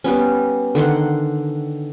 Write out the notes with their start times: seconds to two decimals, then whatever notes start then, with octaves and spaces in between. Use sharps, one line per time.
0.04 G3 B3 C#4
0.75 D3 D#3 F#5 C6